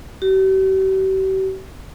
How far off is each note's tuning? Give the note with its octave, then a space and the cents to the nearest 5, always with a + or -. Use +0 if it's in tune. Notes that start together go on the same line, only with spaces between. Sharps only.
G4 -45